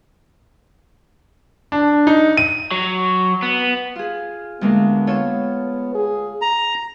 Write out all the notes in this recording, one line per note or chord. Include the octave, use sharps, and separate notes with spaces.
D4
D#4
D#7
F#3
B3
F4 G#4
D2 G#3 A#3 B3
F4 A4 C#5
G#4
A#5